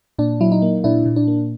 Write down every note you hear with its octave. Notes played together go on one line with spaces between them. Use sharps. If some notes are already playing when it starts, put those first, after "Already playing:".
A#2 D4
F#3 E4
D#4
A#3
A#2 D4 E4
A#2
D4
A#3